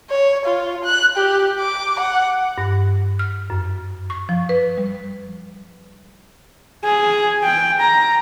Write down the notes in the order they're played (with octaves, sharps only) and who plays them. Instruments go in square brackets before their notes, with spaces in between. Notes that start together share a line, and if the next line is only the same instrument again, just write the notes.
[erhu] C#5
F4
F#6
G4
D6
F#5
[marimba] G2
F6
F#2
C#6
F3
B4
G3
[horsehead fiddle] G#4
G5
A#5